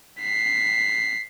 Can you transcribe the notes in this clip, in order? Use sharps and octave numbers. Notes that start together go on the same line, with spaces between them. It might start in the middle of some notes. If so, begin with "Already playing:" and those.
B6 C7